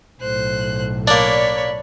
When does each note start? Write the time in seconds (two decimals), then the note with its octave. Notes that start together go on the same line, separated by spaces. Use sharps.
0.21 B1 A2 C5 F#6
1.07 A#3 D4 C#5 D5 B5